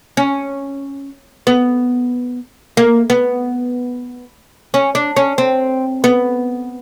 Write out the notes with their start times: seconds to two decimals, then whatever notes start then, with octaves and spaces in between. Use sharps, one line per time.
0.17 C#4
1.47 B3
2.77 A#3
3.10 B3
4.74 C#4
4.95 D4
5.17 C#4
5.38 C4
6.04 B3